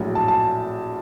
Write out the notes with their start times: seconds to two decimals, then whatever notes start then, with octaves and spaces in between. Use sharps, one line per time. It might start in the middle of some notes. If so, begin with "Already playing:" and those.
Already playing: A#1 A2 F#3
0.15 A5
0.28 A5